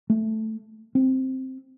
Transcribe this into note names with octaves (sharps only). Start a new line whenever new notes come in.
A3
C4